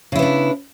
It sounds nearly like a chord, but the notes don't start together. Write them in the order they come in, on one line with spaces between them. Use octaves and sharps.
C#3 E4 B3 D4